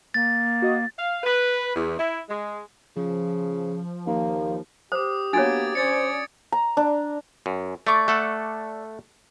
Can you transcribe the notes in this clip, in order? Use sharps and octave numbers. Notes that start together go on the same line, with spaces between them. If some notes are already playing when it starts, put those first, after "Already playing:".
A#3 A6
F#4 D#5 D#6
F5
B4
E2
E4
G#3
C#3 F3
D#2 A#3
G4 C5 D6 D#6
A#3 B3 D4 F#4 C#5 G#6 A6 D7
C#4 C5 D5 G#6 A6 C#7
A#5
D4
F#2
A3 D5 C#6 D6
A3 A4 F#5